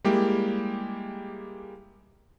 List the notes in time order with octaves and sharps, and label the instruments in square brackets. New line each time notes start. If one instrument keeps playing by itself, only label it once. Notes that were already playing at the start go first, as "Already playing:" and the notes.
[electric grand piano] G3 G#3 A#3 E4 G4